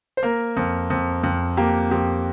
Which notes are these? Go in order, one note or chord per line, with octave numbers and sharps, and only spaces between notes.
C5
A#3 A#4
F2
F2
F2
A#3 G4
F2 G4